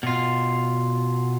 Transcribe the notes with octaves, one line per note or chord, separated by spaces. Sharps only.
B2 F4